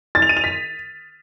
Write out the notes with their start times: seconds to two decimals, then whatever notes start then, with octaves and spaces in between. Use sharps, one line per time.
0.15 A6
0.22 F7
0.29 D#7
0.37 F7
0.44 B6